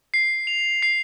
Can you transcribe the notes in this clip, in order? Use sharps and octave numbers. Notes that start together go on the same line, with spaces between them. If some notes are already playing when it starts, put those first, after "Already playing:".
C7
F7
C7